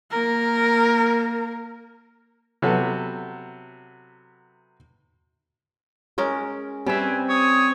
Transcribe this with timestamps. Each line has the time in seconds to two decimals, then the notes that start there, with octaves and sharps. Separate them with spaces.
0.11 A#3 A#4
2.62 C3 F#3 B3 A4
6.18 G#3 C#4 A#4
6.86 G3 C4 C#4 B4 E5 G#5
7.29 C#5 D#6